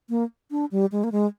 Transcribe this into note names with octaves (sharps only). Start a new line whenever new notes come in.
A#3
D4
G3
G#3
A#3
G#3